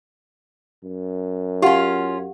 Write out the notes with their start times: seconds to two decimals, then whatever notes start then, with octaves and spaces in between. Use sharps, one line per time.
0.84 F#2
1.62 C#4 F4 G4 F5 F#5